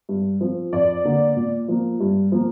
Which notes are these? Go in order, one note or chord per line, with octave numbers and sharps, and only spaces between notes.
G2
F3 C4
F2 D5
D3 A#3
A#2
F3 A#3
G2
F3 A#3